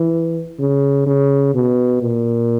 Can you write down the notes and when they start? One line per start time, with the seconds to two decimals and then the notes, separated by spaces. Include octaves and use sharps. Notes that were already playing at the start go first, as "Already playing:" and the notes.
Already playing: E3
0.59 C#3
1.06 C#3
1.54 B2
2.02 A#2